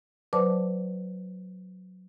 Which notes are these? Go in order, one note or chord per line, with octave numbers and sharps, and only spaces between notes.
F#3 B4 C5 D5 A5 D6